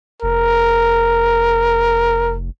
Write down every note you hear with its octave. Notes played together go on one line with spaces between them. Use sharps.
F1 A#4